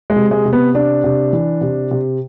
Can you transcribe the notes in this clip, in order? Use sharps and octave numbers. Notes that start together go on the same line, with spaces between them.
G#3
C3
G#3
C3
B3
C3 D4
C3
E3
C3
C3